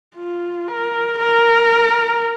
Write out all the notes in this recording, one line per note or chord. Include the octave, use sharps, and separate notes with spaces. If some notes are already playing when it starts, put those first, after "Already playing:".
F4
A#4
A#4